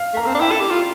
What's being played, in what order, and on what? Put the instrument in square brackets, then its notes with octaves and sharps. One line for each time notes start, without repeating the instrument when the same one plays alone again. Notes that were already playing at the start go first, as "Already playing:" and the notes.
Already playing: [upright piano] F5
[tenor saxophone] A3
[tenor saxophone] A#3 [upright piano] A#5
[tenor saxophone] C4 [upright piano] A5
[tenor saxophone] D4
[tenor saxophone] E4 [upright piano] G5
[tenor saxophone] A4
G4
F4